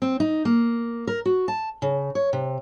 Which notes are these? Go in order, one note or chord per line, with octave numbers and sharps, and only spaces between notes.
C4
D#4
A#3
A#4
F#4
A5
C#3
C#5
C3